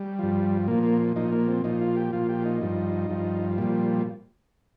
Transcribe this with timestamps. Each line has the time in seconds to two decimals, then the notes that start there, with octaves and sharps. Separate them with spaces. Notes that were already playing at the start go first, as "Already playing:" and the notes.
Already playing: G3
0.19 G2 F3
0.68 A#2 F3 A#3
0.83 A#3
1.16 A#2 F3 D#4
1.32 A#3
1.48 C4
1.64 A#2 F3 D#4
1.81 F4
1.97 G4
2.13 A#2 F3 F4
2.29 G4
2.45 D#4
2.61 G2 F3
3.10 G2 F3
3.58 A#2 F3 G3